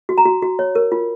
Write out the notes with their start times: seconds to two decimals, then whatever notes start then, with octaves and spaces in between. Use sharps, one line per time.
0.09 F#4
0.18 A#5
0.25 F#4
0.42 F#4
0.59 C#5
0.75 A#4
0.92 F4